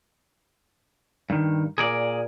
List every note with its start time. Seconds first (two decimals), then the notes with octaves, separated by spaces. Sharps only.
1.30 G2 D#3
1.78 A#2 G#4 A#4 D5